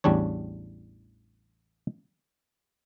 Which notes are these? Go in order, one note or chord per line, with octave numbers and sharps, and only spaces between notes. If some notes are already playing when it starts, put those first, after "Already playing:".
A1 E2 G3 D4 C#5